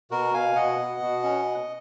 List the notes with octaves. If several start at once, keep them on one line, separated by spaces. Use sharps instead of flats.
B2 F#4 A#4
B2 F5 G#5
B2 D#5 F#5
B2
B2
C#4